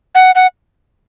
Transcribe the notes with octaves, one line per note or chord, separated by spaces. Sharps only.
F#5
F#5